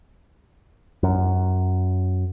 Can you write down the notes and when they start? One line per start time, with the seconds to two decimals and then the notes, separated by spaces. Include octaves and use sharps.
1.03 F#2